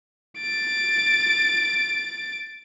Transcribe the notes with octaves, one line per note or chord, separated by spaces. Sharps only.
A6 D7